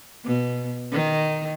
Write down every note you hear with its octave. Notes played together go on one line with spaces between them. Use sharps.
B2
D#3